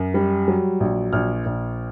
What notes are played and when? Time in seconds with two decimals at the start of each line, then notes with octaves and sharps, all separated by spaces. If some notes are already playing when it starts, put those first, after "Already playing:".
Already playing: F#2
0.14 G3
0.48 F#3
0.80 A#1
1.13 A#1 F6
1.46 A#1